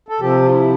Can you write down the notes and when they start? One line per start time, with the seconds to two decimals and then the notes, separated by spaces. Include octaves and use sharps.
0.09 A4
0.20 C3 F3 G4
0.43 F4
0.50 E4